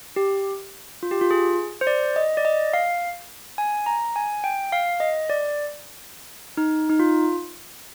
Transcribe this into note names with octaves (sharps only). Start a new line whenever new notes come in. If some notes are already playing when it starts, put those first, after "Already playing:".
G4
F4
G4
F4
G#4
C5
D5
D#5
D5
D#5
F5
G#5
A#5
G#5
G5
F5
D#5
D5
D#4
D#4
F4